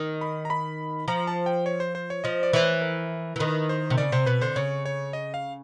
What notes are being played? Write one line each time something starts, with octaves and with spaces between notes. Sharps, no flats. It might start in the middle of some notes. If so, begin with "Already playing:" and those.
Already playing: D#3
B5
A#5
B5
F3 A#5
A5
G5
C#5
C5
C5
C#5
F3 D#5
D5
E3 C5
C#5
A#4
E3
D#3 B4
C5
C3
C#3 D5
C3 C5
B2 B4
D3 C5
C#3 C#5
C#5
D#5
F5